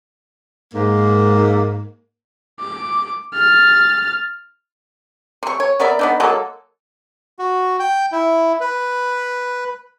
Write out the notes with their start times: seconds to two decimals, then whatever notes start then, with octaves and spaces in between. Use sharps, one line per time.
0.74 G#2 A#3
2.60 D6
3.34 F6 A6
5.43 C3 C#6
5.60 C#5
5.80 B3 A#4 D5 E5
5.99 B3 D4 D#4
6.20 F#3 G#3 A#3 A4
7.39 F#4
7.79 G5
8.12 E4
8.60 B4